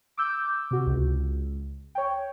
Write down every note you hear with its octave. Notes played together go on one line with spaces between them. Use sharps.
D6 E6 G6
C3 F#4
C#2
C#5 G5